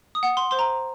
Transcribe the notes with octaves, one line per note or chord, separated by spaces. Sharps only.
D#6
F#5
C6
C5 C6
A#5